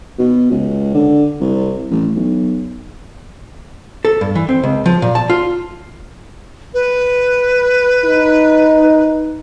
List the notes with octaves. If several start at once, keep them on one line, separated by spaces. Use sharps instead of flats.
B2
C#2
D3
C2
A1
B1
A4
G2
E3
C4
C#2
F3
A#2
A5
F4
B4
D#4